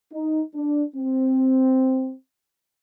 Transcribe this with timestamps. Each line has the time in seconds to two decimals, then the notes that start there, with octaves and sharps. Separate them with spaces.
0.12 D#4
0.54 D4
0.96 C4